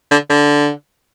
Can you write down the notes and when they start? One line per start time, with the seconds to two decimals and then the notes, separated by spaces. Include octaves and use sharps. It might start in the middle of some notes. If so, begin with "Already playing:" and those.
0.11 D3
0.30 D3